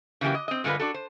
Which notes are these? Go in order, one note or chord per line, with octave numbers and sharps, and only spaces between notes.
C#3 E3 F#3 A#3 G4
D#5
C4 D#5
G2 D3 G#3 F4 A#4 B4
D4 F#4 A4
C5